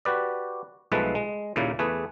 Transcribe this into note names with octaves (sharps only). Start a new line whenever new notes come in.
F#4 G4 B4 D5
B1 F3 G#3 A3 B4 A5
G#3
D#2 A#2 C#3 A#3 E4
E2 A3 G#4 B4